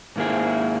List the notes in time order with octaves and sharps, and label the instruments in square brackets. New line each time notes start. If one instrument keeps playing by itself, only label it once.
[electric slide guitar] G#2 D#3 A#3 E4 G#4